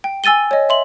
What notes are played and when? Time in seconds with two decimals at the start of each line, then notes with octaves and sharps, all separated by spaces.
0.04 G5
0.24 G#5 E6 A6 D#7 G7
0.51 C#5 D#5
0.69 E5 C6 F#7